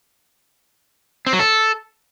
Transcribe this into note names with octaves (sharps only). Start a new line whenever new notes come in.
C4
F#3
A4